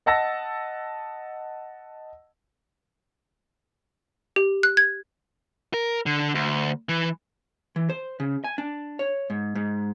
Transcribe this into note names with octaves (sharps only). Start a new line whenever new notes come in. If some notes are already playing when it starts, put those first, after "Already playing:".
D#5 F#5 A5 E6 A#6
G4
F#6
G#6
A#4
D3
D2
E3
E3
C5
C#3
G#5
D4
C#5
G#2
G#2